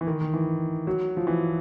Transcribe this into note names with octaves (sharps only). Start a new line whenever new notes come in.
E3
D#3
D#3
E3
F#3
F3
E3